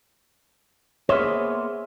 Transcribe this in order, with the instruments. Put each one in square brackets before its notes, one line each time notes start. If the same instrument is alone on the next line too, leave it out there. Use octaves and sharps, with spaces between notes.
[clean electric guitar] A#3 B3 C5 [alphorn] G#4 [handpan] C#5 [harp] D#5 E5 E6